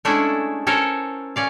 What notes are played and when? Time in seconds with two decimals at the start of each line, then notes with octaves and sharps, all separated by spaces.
0.05 G#3 A3 C#4 D4 E4 E5
0.67 C#4 A4 A#4 C5 C#5
1.36 C#4 D5 F5